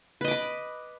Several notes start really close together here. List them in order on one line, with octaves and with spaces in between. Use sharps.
B4 D#5 D6 B5